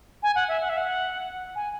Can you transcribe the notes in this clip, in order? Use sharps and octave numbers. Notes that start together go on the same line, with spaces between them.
G#5
F#5
E5
F#5
E5
F#5
G#5